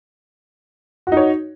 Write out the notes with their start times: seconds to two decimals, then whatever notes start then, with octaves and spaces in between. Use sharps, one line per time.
1.07 F#4
1.12 D#4
1.17 C#5